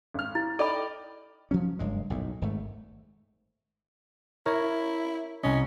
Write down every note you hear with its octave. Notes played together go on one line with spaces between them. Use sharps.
G#1 F6
E4
D#4 A4 D5 G5 B5
F3 F#3 C#4
F#1 G2 G#3
B1 F#2 A2
G#1 G#2 A3
E4 A#4 C#5
C2 C#4 D#5